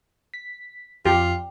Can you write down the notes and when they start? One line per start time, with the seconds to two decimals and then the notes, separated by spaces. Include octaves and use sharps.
0.34 B6
1.05 F2 F4 G4